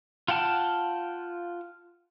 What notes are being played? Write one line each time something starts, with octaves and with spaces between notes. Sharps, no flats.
F4 F#5 G5 A5 F6